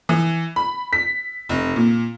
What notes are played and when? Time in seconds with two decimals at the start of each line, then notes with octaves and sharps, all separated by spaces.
0.09 E3
0.56 B5
0.93 B6
1.49 F1
1.76 A#2